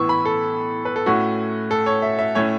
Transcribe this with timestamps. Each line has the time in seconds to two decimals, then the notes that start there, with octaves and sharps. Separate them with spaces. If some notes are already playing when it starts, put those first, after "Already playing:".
Already playing: A2 E3 B3 C#6 E6
0.09 B5
0.25 A4
0.85 B4
0.96 A4
1.06 A2 A3 C#4 F#4
1.71 A4
1.86 C#5
2.02 E5
2.19 E5
2.35 A2 A3 C#4 C#5